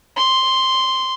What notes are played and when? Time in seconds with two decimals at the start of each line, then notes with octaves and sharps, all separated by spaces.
0.16 C6